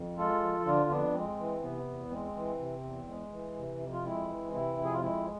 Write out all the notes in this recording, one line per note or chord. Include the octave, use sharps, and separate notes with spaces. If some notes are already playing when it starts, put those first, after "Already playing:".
Already playing: F2
G#3 F4 A4
F3
D3 D4 F4
F2 B3 D4
G#3 C4
E3
C3 B3
E2
G#3 C4
E3
C3
E2
G#3
E3
C3
F2
F4
G#3 C4 E4
E3
C3 C4 E4
F2
G#4
F4
G#3 C4 E4